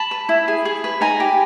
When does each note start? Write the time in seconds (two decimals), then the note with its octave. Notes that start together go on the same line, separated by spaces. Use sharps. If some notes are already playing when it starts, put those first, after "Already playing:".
Already playing: A5 B5
0.11 B4
0.29 E4
0.48 G#4
0.65 G#4
0.84 B4
1.01 D#4 G#5 A#5
1.20 G4